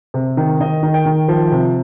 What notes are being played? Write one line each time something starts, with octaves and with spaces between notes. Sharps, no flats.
C3
D#3
D#3 D#5
D#3
G5
D#3
F3
C3